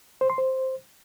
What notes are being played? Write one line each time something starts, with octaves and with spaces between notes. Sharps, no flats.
C5
C6
C5